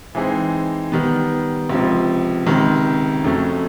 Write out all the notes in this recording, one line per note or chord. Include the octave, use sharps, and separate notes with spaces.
E3 G#3 C4 D#4 G#4
D#3 G3 B3
C#2 C3 F3
C#2 C3 D#3
F2 C#3 F#3 A3 C#4